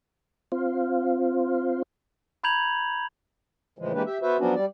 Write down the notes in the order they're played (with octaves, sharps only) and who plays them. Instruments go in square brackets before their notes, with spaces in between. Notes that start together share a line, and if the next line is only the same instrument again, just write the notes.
[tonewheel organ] C4 F4
[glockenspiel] A#5 B5 G6 G#6 F7 F#7
[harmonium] A2 C#3 E3 F3 G#3
E3 G#3 A#3 D4 G4 B4
G4 E5
B3 F#4 B4 C5 E5
F3 F#3 B3 C#4 D4 F#4
G3 D5